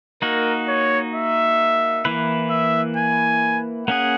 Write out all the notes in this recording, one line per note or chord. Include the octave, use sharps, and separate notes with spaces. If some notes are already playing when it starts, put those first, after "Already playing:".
A#3 D#4 F#4 A#4
C#5
E5
E3 A#3 E4 B4
E5
G#5
A#3 C#4 G#4 F#5